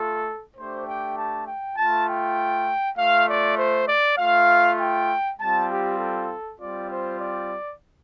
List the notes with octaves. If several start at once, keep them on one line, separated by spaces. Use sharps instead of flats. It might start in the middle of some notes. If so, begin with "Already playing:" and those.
Already playing: A3 F4 A4
A3 D4 G4 C5
G5
A5
G5
A3 F4 A5
G5
A3 F4 F5
D5
C5
D5
A3 F4 F5
G5
G3 C4 F4 A5
G4
A4
G3 C4 F4 D5
C5
D5